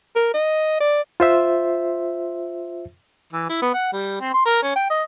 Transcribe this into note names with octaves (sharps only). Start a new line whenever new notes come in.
A#4
D#5
D5
F4 C5 E5
E3
E4
B3
F#5
G3
C4
C6
A#4
C#4
G5
D#5